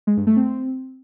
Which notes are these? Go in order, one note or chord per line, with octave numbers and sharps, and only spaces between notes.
G#3
G2
A3
C4